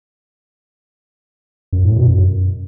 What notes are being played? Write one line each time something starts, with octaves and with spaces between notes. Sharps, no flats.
F#2
A2
B2
F#2